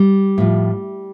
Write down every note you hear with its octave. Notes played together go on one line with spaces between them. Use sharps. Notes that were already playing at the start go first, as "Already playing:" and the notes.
Already playing: G3
A2 F3